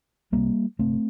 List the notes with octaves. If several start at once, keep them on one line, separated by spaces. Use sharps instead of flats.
C2 C3 G3 A#3
G1 F2 C3 A3 C4